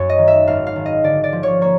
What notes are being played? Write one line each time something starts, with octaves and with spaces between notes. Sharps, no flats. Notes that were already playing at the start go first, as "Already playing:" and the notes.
Already playing: F#2 C#5
D#5
D#3
E5
G#1 F5
F5
G#1
D#5
D3 D5
D5
F3
C#5
A#3 C#5